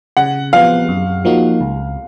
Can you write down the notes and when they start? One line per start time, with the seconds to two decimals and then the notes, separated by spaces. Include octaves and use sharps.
0.17 C#3 F#5
0.53 F3 B3 F5
0.89 F#2
1.25 F3 A#3 D#4 F#4
1.61 C#2